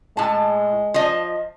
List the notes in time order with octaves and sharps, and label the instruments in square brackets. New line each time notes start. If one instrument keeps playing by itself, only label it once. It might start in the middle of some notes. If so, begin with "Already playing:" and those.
[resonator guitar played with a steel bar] A2 A5 [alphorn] G#3
[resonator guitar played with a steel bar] F3 D#5